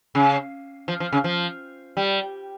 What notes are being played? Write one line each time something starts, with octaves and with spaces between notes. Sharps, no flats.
C#3
F3
F3
C#3
F3
G3